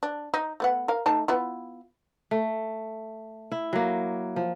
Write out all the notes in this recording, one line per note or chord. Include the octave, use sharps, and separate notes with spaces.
D4
D#4
A3 B3 F#5
A#4 F5
A3 D#4 A5
B3 E4 F4
A3
E4
F#3 A#3
F3